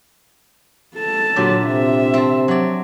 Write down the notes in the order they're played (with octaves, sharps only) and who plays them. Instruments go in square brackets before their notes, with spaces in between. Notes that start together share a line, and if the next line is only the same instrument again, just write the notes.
[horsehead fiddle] A4 A5
[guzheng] A#2 D3 G4 [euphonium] F#3
[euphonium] C3 [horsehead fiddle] E5
[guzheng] C4 A5
F#3 D5